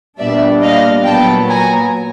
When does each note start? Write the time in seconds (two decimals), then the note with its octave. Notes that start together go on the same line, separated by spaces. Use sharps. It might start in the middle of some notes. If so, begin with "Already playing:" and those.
0.19 A#2 G3 B3 D4 D5 E5
0.63 D#5 F5
1.05 A#2 F#3 B3 G5 A5
1.48 G#5 A#5